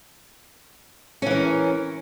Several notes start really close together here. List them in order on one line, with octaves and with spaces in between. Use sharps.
C#4 E3 A#4